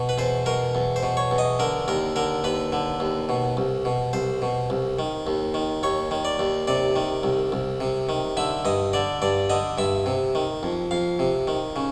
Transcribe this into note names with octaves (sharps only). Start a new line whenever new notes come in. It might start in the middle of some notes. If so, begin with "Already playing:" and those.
Already playing: B2
B4
E2 C5
B2 A#4
E2
C5
B2
C#5
E2
D#5
D3 A#4
D#2 A#4
D3 A#4
D#2 B4
D3
D#2
B2
C2
B2
C2 C5
B2
C2
D#3
D#2
D#3
D#2 C#5
D#3
D5
D#2
C3 D5
D#3
C2
C2
C3
D#3
D3 E5
G2 D#5
D3 D5
G2 D5
D3 D#5
G2 E5
C3
D#3
F2
F2 F5
C3
D#3
C#3